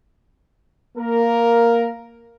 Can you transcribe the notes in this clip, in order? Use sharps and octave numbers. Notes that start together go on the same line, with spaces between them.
A#3 A#4